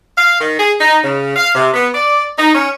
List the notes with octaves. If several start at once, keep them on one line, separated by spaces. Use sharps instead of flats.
F5
D#3
G#4
D#4
C#3
F5
C3
B3
D5
D#4
C#4